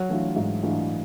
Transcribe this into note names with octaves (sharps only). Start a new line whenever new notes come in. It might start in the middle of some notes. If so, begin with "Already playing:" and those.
Already playing: F#3
E3 A3 D4 F4
G#2
E3 A3 D4 F4